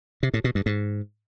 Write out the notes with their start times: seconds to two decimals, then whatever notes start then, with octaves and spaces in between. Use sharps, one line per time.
0.23 C3
0.34 A2
0.44 B2
0.55 G2
0.66 G#2